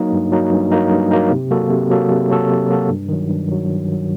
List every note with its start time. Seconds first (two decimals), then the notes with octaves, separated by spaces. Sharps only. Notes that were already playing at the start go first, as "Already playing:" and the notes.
Already playing: F#3 A#3 D#4
0.12 G2
0.32 F#3 A#3 D#4
0.52 G2
0.72 F#3 A#3 D#4
0.91 G2
1.11 F#3 A#3 D#4
1.31 C3
1.51 F#3 A#3 F#4 A4
1.70 C3
1.90 F#3 A#3 F#4 A4
2.10 C3
2.30 F#3 A#3 F#4 A4
2.50 C3
2.69 F#3 A#3 F#4 A4
2.89 G2
3.09 D#3 F#3
3.29 G2
3.49 D#3 F#3
3.68 G2
3.88 D#3 F#3